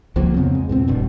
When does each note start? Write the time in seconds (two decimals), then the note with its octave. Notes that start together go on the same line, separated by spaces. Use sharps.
0.16 C#2 F3 F#3 A#3
0.34 F2 C#3 B3 C4
0.55 G#3
0.69 E2 A#2 C4
0.88 E1 G2 B2